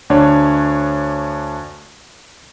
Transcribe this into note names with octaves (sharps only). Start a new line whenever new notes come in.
D2 D4 C#5